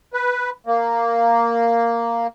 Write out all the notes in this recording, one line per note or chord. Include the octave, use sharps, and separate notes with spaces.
B4
A#3